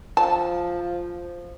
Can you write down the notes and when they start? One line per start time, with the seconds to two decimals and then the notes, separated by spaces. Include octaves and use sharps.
0.17 F3 A5